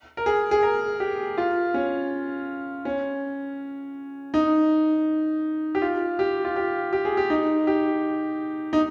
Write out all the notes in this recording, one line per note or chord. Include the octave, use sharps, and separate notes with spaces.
A#4
G#4
G#4
A#4
G4
F4
C#4
C#4
D#4
G4
F4
G4
F4
G4
G4
G#4
G4
D#4
G4
D#4